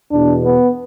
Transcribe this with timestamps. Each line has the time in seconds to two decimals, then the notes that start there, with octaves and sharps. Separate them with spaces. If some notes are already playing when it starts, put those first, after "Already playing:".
0.11 E2 B2 D4
0.45 B3